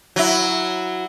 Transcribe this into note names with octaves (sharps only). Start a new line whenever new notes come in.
F#3 E4